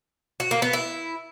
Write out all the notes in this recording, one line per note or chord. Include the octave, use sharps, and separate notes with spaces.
F#4
A#3
B3
E4